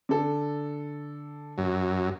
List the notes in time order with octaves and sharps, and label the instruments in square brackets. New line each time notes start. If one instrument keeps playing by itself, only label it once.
[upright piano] D3 A4
[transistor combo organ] F#2